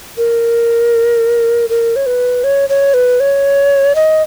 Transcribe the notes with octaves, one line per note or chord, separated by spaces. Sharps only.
A#4
A#4
C#5
B4
C#5
C#5
B4
C#5
D#5